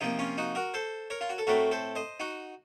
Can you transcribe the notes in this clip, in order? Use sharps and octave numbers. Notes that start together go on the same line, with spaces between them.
C3 F3 A#3 D#4
C#4 F4
D#4 F#4
F#4 A#4
A4 C5
A#4 C#5
F4
F#4
A4
A2 A3 C4 F#4 A#4
A4 C5
C5 D#5
D#4 F#4